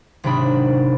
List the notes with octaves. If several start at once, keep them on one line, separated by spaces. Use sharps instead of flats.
G#1 C3 F#3 D4 B5 D#6